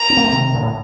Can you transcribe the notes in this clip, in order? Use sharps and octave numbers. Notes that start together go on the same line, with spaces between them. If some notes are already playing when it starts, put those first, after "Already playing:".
Already playing: A#5
C4
A#3
A3 C4
C3 D#3
A#2 D3
A2